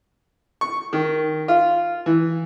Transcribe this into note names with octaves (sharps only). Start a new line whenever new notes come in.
C#6
D#3
F4
E3